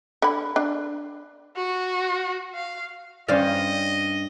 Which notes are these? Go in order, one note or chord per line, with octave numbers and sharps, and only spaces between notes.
D3 B5
D4
F#4
F5
G2 C#4 C5 D5 D#5 F5